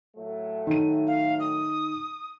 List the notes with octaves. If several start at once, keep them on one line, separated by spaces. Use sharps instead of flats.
A2 F#3 A3
D#3 D#7
F5
D#6